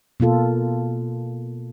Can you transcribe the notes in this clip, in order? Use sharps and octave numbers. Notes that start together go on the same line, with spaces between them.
B2 A#3 F4 A4